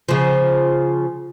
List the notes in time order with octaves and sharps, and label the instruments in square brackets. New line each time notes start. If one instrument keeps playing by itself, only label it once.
[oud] C#3 F3